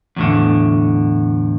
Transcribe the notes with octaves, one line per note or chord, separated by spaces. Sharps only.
E2 A2 D3